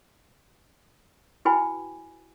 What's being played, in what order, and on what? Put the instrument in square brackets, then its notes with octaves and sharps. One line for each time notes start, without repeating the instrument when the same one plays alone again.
[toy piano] E4 F#4 B4 G5 G#5 B5